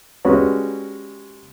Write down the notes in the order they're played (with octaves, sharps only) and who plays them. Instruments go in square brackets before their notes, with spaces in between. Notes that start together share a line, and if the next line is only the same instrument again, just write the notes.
[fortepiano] G3 G#3 C#4 F#4 B4 C#5